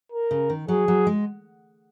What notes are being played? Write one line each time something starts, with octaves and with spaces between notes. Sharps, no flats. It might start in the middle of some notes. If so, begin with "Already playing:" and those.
A#4
C#3
D#3
F#3 G#4
F#3
G#3